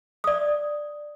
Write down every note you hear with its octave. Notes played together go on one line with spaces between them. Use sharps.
D5 D#6